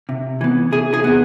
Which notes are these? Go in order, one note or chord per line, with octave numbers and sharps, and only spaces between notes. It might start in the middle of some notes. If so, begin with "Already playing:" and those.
C3
E3 B3
C3 G#4
G#4
E3 B3